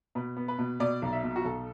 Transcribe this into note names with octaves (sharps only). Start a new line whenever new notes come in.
B2 B4
B3
B4
B2
B2 D5
B1
E5
B2
F#4
B1 A4